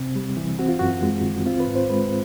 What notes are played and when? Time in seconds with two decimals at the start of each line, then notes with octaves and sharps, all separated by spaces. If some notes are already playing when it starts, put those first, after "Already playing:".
Already playing: C3 C4
0.16 G3
0.37 E3
0.59 C4 F#4
0.68 F4
0.79 F#2 F#4
1.02 G#3
1.24 D#3
1.46 C4 F4
1.60 B4
1.67 G#2
1.75 C5
1.89 G#3 B4